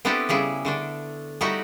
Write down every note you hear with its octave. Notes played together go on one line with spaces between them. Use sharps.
B3 C4 D4 E4 G4 A4
C#3 G3 E4 G#4
D3 A3 D4
G3 A3 D#4 E4 F#4 G4